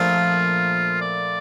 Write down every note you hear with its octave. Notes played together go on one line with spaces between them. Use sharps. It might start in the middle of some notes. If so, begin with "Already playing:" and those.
Already playing: A#1 A#2 F3 A3 F4
D5